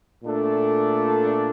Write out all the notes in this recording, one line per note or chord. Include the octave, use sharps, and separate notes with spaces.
A#2 A3 D4 A4